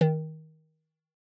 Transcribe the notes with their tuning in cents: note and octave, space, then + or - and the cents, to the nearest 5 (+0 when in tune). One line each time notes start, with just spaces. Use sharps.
D#3 +20